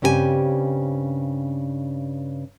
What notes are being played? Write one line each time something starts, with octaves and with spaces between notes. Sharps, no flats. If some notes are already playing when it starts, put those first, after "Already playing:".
G2 C#3 C4 G4 A#4 G#5